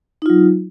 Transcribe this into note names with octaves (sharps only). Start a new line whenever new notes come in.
F#3 D#4 F4